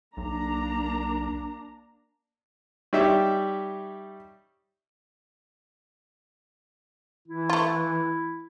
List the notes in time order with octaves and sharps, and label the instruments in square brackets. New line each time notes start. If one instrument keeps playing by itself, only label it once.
[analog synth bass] B1 [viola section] A#3 D4 A#5
[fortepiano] G3 D#4 G4 C#5 E5
[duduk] E3 [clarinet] E4
[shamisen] A3 F4